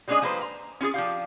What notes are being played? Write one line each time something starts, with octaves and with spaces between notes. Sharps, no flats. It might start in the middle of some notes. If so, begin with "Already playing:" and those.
G3 G#3 C#4 D4 G#4 D#5
F3 G3 A#3 B4 C5
A#5
C#4 F4 G4 G#4
F3 D4 G4 F5